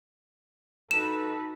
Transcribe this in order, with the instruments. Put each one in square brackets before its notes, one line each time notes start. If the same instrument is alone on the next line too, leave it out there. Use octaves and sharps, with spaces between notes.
[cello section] D#4 F#4 B4 [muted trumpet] A4 [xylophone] E7